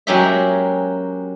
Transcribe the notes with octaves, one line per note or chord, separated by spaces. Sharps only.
F#3 G#3 A#3 C#4 G4 E5